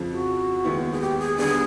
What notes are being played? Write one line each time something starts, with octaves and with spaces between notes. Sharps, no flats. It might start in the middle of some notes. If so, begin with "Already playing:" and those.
Already playing: F2 C#3 F3
F#4
D#2 D#3 G#3 B3 E4
G#4
G4
G#4
D3 G3 B3 D4 G#4